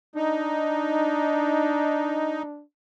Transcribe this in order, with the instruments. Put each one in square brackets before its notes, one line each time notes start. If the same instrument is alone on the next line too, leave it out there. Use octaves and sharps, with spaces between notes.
[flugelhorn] D4 [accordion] D#4